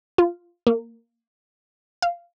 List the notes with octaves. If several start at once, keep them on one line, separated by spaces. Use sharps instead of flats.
F4
A#3
F5